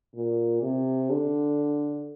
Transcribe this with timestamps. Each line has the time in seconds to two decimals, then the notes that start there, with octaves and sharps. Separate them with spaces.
0.15 A#2
0.62 C3
1.10 D3